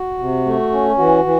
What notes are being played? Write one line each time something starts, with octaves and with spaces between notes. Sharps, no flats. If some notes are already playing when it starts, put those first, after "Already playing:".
Already playing: F#4
C3
A3
C#4
E3 F#4
E3